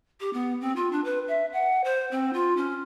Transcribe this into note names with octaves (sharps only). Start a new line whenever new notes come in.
G4
B3
C4
F4
D4
B4
E5
F#5
C5
C4
F4
C#4